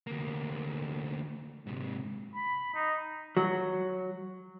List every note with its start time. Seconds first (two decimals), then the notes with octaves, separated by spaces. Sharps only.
0.07 D2 A#3
1.67 G#2 C3
2.35 B5
2.74 D#4
3.37 F#3